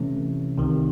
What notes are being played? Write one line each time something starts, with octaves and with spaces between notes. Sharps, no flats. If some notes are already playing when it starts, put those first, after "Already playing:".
Already playing: C3 E3 A3 C#4
C2 C3 D#3